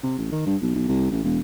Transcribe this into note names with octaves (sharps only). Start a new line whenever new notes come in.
C3
A1
D#3
G2
B1
B1
C2
A1
E1